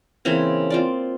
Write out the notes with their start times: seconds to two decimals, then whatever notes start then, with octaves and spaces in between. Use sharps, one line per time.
0.25 C#3 E3 A#3 C4
0.70 C4 F4 D5